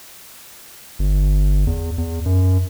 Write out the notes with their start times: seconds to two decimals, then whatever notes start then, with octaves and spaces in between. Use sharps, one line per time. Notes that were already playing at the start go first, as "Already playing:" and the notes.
0.99 G1
1.67 E2
1.98 E2
2.26 F#2